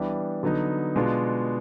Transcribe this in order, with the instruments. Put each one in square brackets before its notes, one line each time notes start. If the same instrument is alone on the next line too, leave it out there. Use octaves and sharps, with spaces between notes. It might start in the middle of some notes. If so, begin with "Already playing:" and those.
Already playing: [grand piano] E3 G3 B3 D4
D3 F#3 B3 D#4
B2 G#3 B3 D4 F4